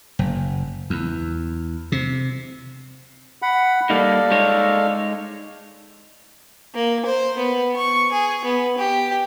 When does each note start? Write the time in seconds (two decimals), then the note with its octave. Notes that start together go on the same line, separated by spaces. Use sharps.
0.19 F#1
0.90 E2
1.92 C3
3.42 F#5 B5
3.90 G3 A#3 D#4 A4 D5 F5
4.31 G#3 D#4 C#5
6.75 A#3
7.05 C5
7.38 B3
7.76 C#6
8.12 G#4
8.44 B3
8.78 G4